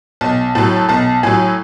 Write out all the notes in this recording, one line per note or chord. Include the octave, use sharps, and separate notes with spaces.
B1 A5
A2 F#3 A5
A5
B1 A5
A2 F#3 G#5